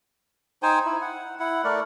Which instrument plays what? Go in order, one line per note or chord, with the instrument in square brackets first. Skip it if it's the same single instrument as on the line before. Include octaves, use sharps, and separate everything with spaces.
[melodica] D#4 C5 G5 G#5
E4
F#5
E4 F#5
A3 A#4 D5